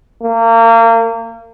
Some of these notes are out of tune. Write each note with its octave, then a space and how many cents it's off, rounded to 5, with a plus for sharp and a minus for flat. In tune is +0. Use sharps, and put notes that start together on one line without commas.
A#3 -30